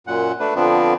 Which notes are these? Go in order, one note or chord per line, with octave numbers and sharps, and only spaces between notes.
F#2 A#2 F#5
A3 D4 B4
F2 D3 F3 B3 C4 D4